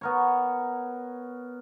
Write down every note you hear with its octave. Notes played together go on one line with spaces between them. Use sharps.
B3 A#4 C#5